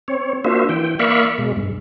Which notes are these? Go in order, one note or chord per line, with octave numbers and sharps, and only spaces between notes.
C4 C#5
A#3 D4 F4 F#4 C5 E5
E3 G5
A#3 D5 E5 F5 B5 C#6
B2 G#3
G2